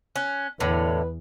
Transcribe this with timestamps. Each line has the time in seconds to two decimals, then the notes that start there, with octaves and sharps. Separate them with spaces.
0.16 C#4 F#6
0.60 E2 A2 D3 B4 C#5